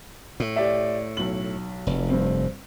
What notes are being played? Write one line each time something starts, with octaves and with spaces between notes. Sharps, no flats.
A2
G4 D5 E5
B1 F#7
F1
G2 C4